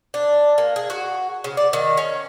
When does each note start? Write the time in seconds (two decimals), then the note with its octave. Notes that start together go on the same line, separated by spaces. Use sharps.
0.14 D4
0.58 A#3
0.76 G#4
0.90 F#4
1.44 C#3
1.57 D5
1.73 D#3
1.97 C#4